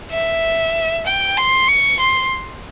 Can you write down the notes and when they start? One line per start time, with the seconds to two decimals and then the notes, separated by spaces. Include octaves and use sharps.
0.11 E5
1.06 G5
1.38 C6
1.68 C#6
1.99 C6